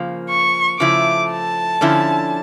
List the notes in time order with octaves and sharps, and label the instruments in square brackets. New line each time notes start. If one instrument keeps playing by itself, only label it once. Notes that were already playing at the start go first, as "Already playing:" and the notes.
Already playing: [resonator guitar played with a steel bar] C#3 F3 A#3
[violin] C#6
[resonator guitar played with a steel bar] C#3 F3 A3 E4 [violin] D6
[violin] A5
[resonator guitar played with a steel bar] D3 F3 C#4 E4